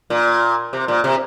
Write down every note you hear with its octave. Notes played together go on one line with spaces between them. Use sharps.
A#2
C3
A#2
C3